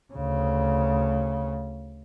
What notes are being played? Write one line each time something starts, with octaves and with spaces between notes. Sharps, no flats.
D2 C#3